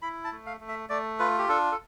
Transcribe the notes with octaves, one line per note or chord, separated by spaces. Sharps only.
E4 B5
A5
A3
F5
A3
E5
A3 D5
F4 B4
G4
D4 A4
A4